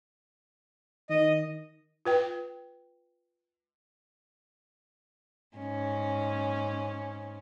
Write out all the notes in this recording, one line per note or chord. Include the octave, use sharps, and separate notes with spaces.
D#3 D#5
F4 B4 G5
G#2 C#4